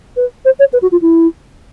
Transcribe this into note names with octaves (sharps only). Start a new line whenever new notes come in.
B4
C5
C#5
B4
F#4
F4
E4